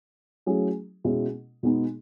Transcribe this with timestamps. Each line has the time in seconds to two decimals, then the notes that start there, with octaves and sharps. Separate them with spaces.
0.46 F#3 A3 C#4 E4 G#4
1.04 B2 G#3 C#4 E4 G#4
1.63 B2 G#3 B3 D#4 G#4